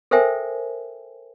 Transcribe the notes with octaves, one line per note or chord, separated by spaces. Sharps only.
A4 A#4 C5 E5 G5 G#5